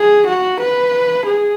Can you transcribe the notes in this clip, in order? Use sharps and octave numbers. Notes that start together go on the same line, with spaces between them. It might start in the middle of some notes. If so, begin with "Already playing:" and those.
Already playing: G#4
F#4
B4
G#4